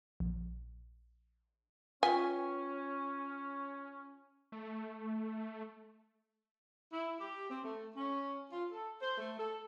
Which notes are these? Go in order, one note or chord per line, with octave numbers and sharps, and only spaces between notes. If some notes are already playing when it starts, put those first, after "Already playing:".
A#1
C#4 F4 B4 G5 G#5
A3
E4
G4
C4
A3
C#4
F4
A4
C5
A3
A4